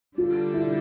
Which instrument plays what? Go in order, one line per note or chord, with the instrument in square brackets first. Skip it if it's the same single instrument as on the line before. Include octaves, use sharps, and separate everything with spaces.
[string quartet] D3 G3 D4 A4 [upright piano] F4
[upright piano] E4